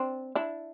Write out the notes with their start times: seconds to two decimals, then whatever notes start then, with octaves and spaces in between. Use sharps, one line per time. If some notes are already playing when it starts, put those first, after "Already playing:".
Already playing: C4 D4
0.35 D4 E4